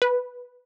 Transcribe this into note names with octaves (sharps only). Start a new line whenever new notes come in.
B4